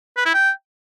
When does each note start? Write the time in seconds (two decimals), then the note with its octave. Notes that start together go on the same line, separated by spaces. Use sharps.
0.17 B4
0.26 E4
0.34 G5